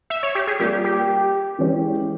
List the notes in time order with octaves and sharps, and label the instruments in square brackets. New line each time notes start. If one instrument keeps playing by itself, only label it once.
[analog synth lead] E5
C#5
G4
G#4
[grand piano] G3 A#3 F4 [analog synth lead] G4
[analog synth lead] G4
[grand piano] E3 G#3 C#4 G4